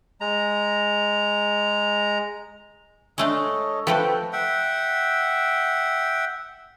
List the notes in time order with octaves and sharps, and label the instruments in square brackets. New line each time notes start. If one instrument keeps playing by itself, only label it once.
[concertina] G#3 A#5
[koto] G#3 A3 D4 [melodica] A4 C#5 D#5
[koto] F3 A3 F#4 [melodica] C4 [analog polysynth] A4 B4 G5
[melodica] E5 F#5 G5